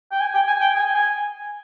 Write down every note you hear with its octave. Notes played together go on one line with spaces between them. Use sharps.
G5
G#5
G5
G#5
G5
G#5
G#5